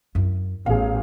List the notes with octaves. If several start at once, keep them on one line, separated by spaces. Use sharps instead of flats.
F#2 E4
A1 B3 G#4 F5